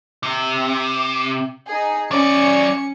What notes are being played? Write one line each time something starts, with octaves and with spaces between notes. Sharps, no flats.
C3
D#4 G#4
F#3 C#4 D5 C#7